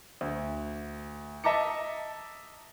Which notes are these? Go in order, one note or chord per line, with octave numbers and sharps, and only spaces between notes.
D2
D#5 E5 A5 A#5 D6 C#7